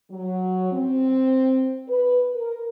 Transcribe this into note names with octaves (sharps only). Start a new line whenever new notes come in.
F#3
C4
B4
A#4